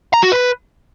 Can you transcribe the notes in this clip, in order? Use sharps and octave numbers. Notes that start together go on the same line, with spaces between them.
A#5
F#4
B4